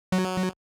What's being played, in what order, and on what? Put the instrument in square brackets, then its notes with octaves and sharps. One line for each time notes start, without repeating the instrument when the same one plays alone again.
[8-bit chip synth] F#3